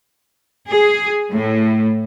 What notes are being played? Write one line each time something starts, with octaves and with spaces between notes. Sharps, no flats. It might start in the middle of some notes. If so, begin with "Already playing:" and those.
G#4
A2